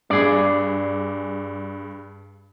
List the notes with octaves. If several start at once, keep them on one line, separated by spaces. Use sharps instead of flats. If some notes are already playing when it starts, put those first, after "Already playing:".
G2 G#4 D5